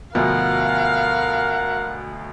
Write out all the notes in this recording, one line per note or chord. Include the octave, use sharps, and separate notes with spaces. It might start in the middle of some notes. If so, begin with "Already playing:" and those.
D2 B2 F3 A#4 F5 F#5